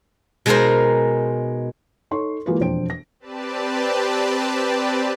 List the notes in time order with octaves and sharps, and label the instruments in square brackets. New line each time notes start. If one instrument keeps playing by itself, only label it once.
[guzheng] B2 G#3 D#4 G#4 A#4 C5
[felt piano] D#4 A4 C#5 C6 C#6
E3 G#3 A#3 F4 F#4 B4
E1 F2 D4 C5 G5 D7
A#6
[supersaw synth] C4 G4 B4 D5 A5